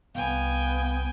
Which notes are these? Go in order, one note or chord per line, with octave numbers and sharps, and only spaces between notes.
C2 B3 F5 G5 G#5